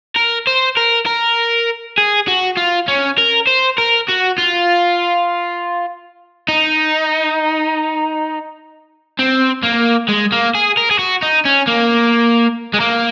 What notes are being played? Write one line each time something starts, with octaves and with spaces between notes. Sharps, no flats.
A#4
C5
A#4
A#4
G#4
F#4
F4
C#4
A#4
C5
A#4
F#4
F4
D#4
C4
A#3
G#3
A#3
G#4
A#4
G#4
F#4
D#4
C#4
A#3
G#3
A#3